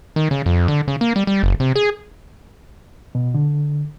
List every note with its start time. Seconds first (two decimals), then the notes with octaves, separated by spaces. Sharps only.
0.16 D#3
0.31 C#3
0.46 F2
0.68 D3
0.88 C#3
1.01 A#3
1.16 G3
1.27 G3
1.43 F#1
1.60 C3
1.76 G#4
3.15 B2
3.34 D3